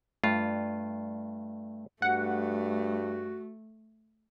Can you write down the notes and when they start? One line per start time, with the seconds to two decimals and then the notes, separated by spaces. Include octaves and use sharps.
0.24 G2 A3 F4
2.02 G2 A3 F#4 F#5